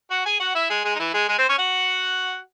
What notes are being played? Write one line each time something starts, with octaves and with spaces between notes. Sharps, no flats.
F#4 F#5
G#4 G#5
F#4 F#5
E4 E5
G#3 G#4
G#3 G#4
D#4
E3 E4
G#3 G#4
G#3 G#4
C4 C5
C#4 C#5
F#4 F#5